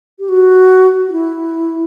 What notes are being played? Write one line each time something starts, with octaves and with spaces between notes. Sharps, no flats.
G4
F#4
F#4
E4